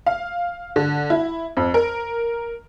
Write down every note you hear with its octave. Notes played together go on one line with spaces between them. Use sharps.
F5
D3
E4
F2
A#4